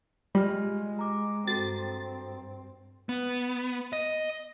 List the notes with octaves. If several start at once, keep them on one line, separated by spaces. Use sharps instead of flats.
G3 G#3 F4 G4 F6
A#5 D6
G2 C4 F#4 A4 A#5 A6
B3
D#5